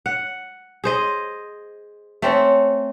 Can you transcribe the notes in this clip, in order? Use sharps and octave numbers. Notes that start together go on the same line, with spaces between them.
F#5
G#4 C5 D#5
A3 C4 C#4